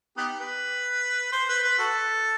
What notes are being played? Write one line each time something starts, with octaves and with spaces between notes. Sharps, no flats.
B3 D#4 G4
B4
C5
B4
B4
F#4 A4